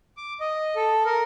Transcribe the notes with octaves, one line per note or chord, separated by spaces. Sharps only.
D6
D#5
A4
A#4